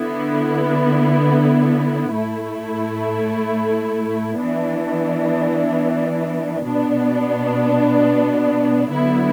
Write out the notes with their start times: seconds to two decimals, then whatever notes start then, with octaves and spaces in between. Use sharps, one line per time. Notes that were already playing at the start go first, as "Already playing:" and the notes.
Already playing: D3 B3 E4
2.14 A2 A3 E4
4.39 E3 B3 D4
6.64 B2 B3 D4
8.90 D3 F#3 B3 E4